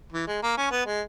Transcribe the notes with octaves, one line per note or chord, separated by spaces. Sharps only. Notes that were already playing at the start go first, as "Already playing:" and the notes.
E3
G#3
A#3
C#4
B3
G#3